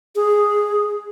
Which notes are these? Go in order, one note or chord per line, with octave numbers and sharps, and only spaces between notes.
G#4